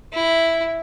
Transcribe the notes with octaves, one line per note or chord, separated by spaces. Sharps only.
E4